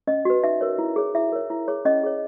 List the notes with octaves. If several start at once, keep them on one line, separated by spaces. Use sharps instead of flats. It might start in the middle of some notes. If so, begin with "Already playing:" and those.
C#4 D#5
F#4 B4
D#4 E5
A#4 C#5
E4
G#4 C#5
E4 E5
A#4 C#5
E4
G#4 C#5
C#4 D#5
G#4 C#5